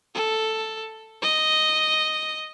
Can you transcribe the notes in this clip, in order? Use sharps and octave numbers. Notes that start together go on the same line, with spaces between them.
A4
D#5